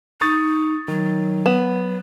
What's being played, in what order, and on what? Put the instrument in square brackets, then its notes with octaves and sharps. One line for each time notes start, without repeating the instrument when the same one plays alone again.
[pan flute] D#4 [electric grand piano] C#6 D#6 A6
[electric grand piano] D#3 [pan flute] F#3
[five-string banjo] B3 [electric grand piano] E7